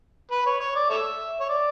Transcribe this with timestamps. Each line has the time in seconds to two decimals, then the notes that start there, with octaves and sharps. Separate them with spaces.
0.31 B4
0.46 C#5
0.60 C#5
0.76 D5
0.90 A4 C#5 E5
1.40 C#5
1.49 D5